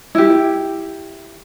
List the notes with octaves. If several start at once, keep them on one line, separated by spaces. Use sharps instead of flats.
E4 G4